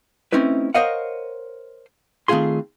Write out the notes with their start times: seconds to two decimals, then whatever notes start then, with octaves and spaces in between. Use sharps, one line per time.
0.32 A3 C4 C#4 D#4 E4 B4
0.74 A#4 C5 C#5 D#5 F5 F#5
2.28 D#3 A3 C4 F4 G#4 C6